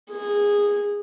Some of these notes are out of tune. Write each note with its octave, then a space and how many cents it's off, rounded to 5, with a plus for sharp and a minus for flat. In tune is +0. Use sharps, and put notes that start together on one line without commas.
G#4 -15